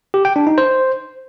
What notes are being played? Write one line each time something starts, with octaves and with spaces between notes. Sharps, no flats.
G4
G5
D4
D#4
C5